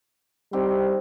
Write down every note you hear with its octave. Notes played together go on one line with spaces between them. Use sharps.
D#3 G3 C4 G4